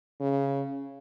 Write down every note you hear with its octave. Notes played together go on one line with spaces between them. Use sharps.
C#3